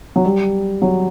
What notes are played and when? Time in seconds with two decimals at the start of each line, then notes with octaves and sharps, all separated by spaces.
0.16 F#3
0.25 G3
0.82 F#3